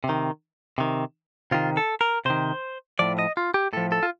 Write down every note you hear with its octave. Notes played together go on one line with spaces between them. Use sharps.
C3
D#3
C3 D#3
C3 D#3 F4
A4
A#4
C3 D#3 C5
A2 F3 D5
D#5
F4
G4
A2 F3 A4
A4
F4